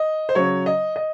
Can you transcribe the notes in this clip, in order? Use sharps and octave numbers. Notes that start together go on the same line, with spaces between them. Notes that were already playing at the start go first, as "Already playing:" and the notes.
Already playing: D#5
C5
C#3 F#3 C#5
D#5
D#5